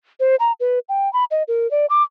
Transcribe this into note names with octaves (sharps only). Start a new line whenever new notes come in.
C5
A#5
B4
G5
B5
D#5
A#4
D5
D6